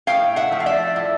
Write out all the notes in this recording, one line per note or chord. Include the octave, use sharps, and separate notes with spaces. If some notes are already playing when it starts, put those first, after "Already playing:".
A2 F5 G5
E5 F#5
F3 A3
F5
D5 E5
A2